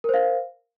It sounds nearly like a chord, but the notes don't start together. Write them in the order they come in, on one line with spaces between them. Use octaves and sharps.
A#4 C5 F5